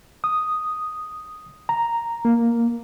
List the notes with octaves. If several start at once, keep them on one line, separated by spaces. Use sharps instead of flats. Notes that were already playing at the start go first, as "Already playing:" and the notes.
D#6
A#5
A#3